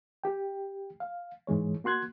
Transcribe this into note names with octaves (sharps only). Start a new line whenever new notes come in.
G4 G5
F5
G#2 E3 G#3 C#5
A#3 F#4 C6 F#6 G#6